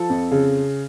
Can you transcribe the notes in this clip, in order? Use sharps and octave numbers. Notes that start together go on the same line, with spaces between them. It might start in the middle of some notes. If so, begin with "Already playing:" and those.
Already playing: F3 A4
F2
C#3